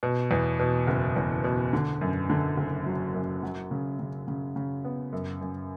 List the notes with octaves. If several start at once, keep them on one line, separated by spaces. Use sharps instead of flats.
B2
E2
B2
F#1
E2
B2
D3
F#2
D3
F#1
F#3
F#2
F#3
C#3
C#3
C#3
C#3
B3
F#2
F#2